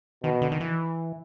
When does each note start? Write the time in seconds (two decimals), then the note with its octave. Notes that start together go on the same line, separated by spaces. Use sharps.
0.24 B2 D#3
0.42 D3
0.52 D#3
0.60 E3